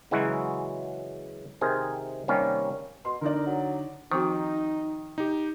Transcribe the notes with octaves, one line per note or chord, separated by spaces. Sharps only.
C#3 E3 F#3 G#3 E4 F#4
C3 D#3 G#4 A#4 C5
C3 D#3 G3 A#3 C#4
B2 C6
D3 D#4 A#4 D5
F#3
D#3 F3 C4 D#4 F#4
D#4 G4